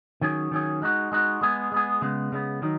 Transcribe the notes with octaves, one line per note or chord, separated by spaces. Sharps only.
D#3 F#3 C#4 G#4
D#3 F#3 C#4 G#4
G#3 D#4 F#4
G#3 D#4 F#4
G#3 B3 G#4
G#3 B3 G#4
C#3 G#3 B3
C#3 G#3 B3
D#3 F#3 D#4